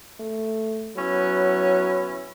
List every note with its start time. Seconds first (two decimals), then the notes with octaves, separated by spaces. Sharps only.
0.20 A3
0.97 F#3 B3 C#4 E4